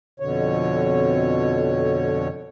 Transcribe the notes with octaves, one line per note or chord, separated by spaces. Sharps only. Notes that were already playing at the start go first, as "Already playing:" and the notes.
F2 B2 D3 C#5